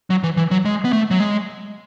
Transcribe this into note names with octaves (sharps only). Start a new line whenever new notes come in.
F#3
E3
E3
F#3
G#3
B3
A3
F#3
G#3